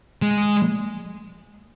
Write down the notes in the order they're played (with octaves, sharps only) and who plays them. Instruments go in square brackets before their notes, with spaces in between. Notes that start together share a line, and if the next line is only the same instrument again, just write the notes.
[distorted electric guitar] G#3